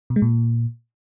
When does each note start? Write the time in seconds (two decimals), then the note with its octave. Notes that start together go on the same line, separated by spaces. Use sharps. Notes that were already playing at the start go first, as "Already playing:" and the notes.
0.10 B2
0.16 G#3
0.22 A#2